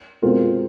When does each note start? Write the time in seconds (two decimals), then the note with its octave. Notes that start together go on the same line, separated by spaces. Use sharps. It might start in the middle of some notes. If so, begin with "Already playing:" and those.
0.22 B2 G#3 C4 F4 A#4